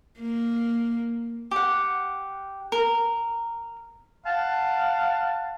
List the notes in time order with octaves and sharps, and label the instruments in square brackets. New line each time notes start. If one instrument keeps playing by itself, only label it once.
[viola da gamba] A#3
[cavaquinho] G4 F#5
A#4
[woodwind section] F5 F#5 A5